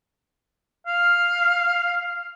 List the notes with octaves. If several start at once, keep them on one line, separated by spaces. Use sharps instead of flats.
F5